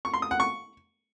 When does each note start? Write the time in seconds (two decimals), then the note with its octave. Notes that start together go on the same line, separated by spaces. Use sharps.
0.05 C#6
0.14 C6
0.22 D#6
0.31 F#5
0.40 C#6